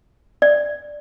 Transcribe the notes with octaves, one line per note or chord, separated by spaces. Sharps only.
D5